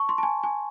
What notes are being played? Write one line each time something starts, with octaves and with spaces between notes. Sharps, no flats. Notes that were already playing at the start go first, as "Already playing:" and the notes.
Already playing: A5 C#6
C6
A5
G#5
G#5